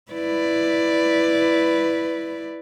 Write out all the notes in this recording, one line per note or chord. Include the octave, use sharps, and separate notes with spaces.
E4 B4 D5